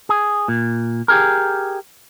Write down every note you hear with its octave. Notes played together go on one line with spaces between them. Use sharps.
G#4
A#2
G4 G#4 A#4